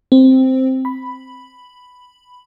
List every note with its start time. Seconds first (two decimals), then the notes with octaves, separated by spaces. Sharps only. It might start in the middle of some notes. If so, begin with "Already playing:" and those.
0.12 C4
0.85 B5